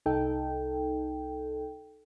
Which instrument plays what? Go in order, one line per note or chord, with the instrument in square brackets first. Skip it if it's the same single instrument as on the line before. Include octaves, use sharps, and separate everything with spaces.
[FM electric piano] C2 D#4 A4 G5